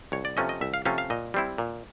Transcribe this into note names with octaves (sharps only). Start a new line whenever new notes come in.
C2 C#5
D5
C3 F3 A3 C#4 D#5
D#5
C2 E5
F5
C3 F3 A3 C#4 F5
F5
A#2 D#5
G3 C4 E4
A#2